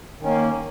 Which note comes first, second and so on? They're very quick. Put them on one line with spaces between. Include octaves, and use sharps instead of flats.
D#3 C#4 A#3